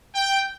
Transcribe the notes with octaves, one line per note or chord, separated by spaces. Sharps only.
G5